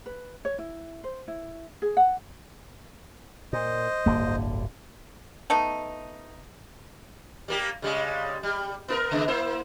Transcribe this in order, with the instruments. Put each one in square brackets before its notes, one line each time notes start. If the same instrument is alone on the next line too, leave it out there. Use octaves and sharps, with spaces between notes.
[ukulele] B4
C#5
E4
C5
E4
G#4
F#5
[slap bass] A#2 [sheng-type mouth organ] C5 D#5
[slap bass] D1 G1 D3 [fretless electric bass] A#3
[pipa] A3 B3 D#4
[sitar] G3 A#3 G4
C#3 G3 G#3
G3
B3 E4 A#4
C#3 G#3 B3
A#3 E4 C5